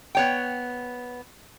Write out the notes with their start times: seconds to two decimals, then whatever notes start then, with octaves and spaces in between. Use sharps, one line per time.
0.15 B3 C#5 G5